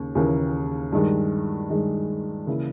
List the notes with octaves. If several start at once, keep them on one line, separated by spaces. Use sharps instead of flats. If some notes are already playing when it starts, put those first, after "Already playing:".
Already playing: D#2 C#3 C#4
D#2 C#3 E3 A#3 C#4
G2 D#3 G#3
G2 D#3 G#3
C#3 E3 A#3 E4